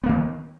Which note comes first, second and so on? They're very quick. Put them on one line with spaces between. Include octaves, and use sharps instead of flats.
B3 A#3 D#3